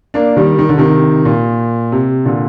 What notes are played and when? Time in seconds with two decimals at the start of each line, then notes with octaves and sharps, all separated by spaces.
0.14 A#3 D4
0.36 D#3 G3
0.59 D#3
0.69 D3
0.78 C3 D#3
1.25 A#2
1.92 C3
2.25 A#2 D3